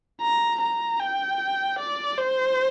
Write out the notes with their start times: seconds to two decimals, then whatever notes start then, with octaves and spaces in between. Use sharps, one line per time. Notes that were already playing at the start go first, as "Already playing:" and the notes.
0.22 A#5
0.61 A#5
1.00 G5
1.79 D5
2.18 C5